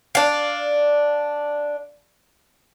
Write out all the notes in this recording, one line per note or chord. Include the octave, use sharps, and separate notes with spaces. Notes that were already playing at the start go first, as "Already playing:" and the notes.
D4 F5